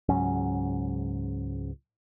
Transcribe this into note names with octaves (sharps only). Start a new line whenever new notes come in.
C#2 G#2 F#3 C#4